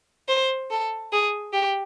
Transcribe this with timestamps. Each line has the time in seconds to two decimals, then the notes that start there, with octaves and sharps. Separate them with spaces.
0.28 C5
0.70 A4
1.12 G#4
1.53 G4